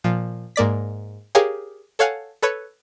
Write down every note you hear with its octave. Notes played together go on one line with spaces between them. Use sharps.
A#2 F3
G#2 A#3 D5 B6
G4 G#4 A#4 C#5 F5
A4 C#5 F5 F#5 G#5
A4 B4 C#5